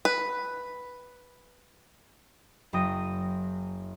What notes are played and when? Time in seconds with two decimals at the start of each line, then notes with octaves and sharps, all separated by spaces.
0.05 B4
2.73 F#1 F#2 G5 D#6 A#6 D#7